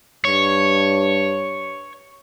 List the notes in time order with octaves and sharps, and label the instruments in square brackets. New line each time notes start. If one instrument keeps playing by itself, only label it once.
[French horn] G2 [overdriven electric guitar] C#5